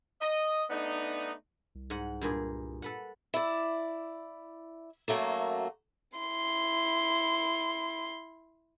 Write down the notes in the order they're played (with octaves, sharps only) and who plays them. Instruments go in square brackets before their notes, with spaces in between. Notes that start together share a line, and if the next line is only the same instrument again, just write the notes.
[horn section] D#5
A3 B3 D4 D#4
[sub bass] C2
[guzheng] G#2 F#5
G2 A#2 G#4
A4 B4 F#5
[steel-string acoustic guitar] E4 D5
F#2 F#3 A3 A#3
[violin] E4 C6